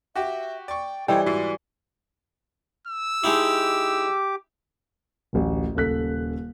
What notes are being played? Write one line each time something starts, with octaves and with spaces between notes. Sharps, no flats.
F#4 G4 E5 G5
D5 G5 C#6
E3 G3 G4 A4 C5 C#5 D#5 G5
G#2 E4 F#4
E6
G#3 D#4 E4 G4 D6
D1 A1
D#1 C#3 A4 F#6 B6